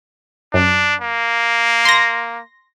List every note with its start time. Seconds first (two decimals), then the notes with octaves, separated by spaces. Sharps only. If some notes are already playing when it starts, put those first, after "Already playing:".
0.54 F#2 D4
1.01 A#3
1.85 C6 A#6